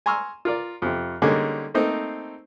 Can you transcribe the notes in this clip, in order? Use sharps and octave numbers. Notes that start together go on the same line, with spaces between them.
G#5 A#5 C6 C#6 E6 F6
F4 A#4 D5
F2 C3
D3 G3 G#3 A#3 C#4 D#4
A3 A#3 C4 D#4 C5